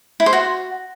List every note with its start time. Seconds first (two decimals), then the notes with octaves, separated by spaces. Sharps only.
0.20 E4
0.26 C5
0.33 F#4